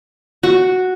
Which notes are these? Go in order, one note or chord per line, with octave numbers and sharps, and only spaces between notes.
F#4